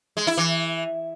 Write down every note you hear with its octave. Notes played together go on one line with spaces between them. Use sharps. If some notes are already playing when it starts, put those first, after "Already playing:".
G#3
E4
E3